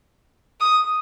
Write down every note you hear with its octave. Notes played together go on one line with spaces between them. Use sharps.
D#6